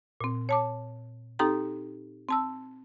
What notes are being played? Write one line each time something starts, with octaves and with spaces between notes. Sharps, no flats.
A#2 C4
C#5 A5 D6
C4 D#4 G4 A4 G5 A#5
C4 A5 E6